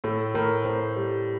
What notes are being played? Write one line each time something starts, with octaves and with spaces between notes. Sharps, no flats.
A2 A4
A2 A#4
A2 C5
G3